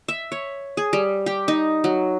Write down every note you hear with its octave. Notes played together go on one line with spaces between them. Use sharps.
E5
C#5
G#4
G3
G4
D#4
F#3